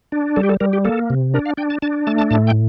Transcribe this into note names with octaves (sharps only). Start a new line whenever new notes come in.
D4
G3 A4
G4
A4
G3 A#4
G4
A#3 A4
C3
D4 A#4
F5
D4 G5
A5
D4 A5
A3 A5
A5
A2 A5
G5